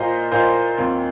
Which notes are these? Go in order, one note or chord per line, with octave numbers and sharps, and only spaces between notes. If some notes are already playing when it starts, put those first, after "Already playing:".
Already playing: A#2 A#3 F4 C5 D#5
A#2 A#3 F4 C5 D#5
D#2 D#3 C4 F4